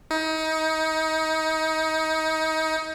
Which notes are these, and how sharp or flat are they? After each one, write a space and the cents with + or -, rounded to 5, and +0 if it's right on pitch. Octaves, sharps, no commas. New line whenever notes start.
D#4 +30